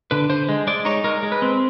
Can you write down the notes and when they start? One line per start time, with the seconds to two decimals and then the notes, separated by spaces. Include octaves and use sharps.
0.11 D3 B4
0.30 D3 C5
0.49 G#3
0.67 G#3 D5
0.85 D#4 C#5
1.04 G#3 A#4
1.23 G#3
1.32 B4
1.42 C4